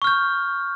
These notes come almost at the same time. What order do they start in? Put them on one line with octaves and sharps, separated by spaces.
C#6 F6 G6